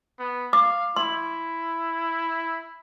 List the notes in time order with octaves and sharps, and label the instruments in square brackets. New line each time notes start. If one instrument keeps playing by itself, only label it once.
[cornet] B3
[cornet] F5 [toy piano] D6
[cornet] E4 [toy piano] C6